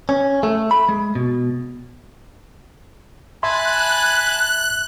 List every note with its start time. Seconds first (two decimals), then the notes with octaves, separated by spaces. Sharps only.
0.09 C#4
0.43 A3
0.71 B5
0.89 G#3
1.15 B2
3.43 E5 G#5 A5 B5 C6 F#6